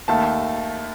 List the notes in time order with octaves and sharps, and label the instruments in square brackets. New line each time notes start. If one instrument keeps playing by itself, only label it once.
[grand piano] D#2 D#3 A3 A5